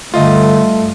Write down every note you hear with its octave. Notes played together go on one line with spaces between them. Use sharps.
G2 D3 G3 A3 F4 D#5